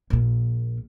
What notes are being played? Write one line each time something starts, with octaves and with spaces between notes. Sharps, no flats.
A#1 A#2